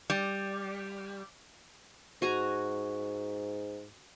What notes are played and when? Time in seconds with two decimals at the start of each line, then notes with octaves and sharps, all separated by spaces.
0.10 G3
2.22 G#2 F#4 G#5 A#5